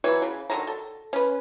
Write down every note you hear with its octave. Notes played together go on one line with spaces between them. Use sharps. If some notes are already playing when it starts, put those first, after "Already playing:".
E3 F#3 B4 C#5
C#3
D3 D#3 F#3 A#5
A4
C#4 B4